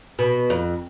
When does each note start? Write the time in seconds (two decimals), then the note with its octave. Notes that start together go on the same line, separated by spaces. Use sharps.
0.19 B2
0.50 F2